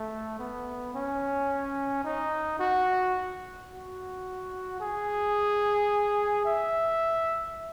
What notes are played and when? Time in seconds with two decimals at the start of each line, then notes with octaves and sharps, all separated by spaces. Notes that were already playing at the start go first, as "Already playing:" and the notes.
Already playing: A3
0.39 B3
0.94 C#4
2.04 D#4
2.59 F#4
3.70 F#4
4.80 G#4
6.45 E5